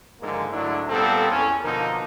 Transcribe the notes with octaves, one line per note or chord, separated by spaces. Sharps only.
G#2 D3 D#3 F3 G#3 A#3
G#2 D3 F#3 A3 D4 E4
A#2 G3 B3 C4 A4
E2 C#4
B2 D3 F3 A#3 D#4 A#4